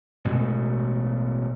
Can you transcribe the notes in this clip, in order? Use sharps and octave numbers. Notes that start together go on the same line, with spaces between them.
A1 B2 G#3 A3